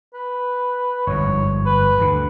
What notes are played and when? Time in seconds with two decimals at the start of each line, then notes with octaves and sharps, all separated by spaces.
0.14 B4
1.07 G1 F2 G#2 C#5
1.66 B4
1.98 D2 D3